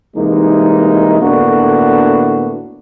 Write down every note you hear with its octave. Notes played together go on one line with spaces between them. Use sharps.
C2 E3 G#3 A#3 D#4
A2 D3 A#3 B3 D4 F#4